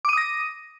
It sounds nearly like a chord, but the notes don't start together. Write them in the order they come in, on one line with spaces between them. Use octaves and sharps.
D6 D#7 D#6 A#6